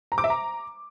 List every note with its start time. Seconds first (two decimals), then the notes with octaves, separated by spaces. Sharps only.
0.12 A#5
0.18 D6
0.24 E5
0.30 A#5